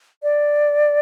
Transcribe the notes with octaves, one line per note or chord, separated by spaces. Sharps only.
D5